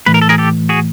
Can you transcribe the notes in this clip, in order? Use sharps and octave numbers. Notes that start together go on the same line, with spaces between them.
A2 E3 A3 B4
A#4
A4
G#4 A#4
G4 A4
F#4 G#4